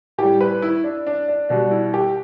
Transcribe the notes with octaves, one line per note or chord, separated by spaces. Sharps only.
A2 G3 G4
B4
E4
D4
D4
D4
B2 G3 D4
E4
G4